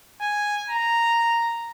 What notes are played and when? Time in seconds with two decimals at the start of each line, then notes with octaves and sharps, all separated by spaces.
0.21 G#5
0.70 A#5